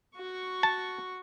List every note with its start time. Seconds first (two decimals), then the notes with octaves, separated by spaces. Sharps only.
0.17 F#4 C#6
0.63 A5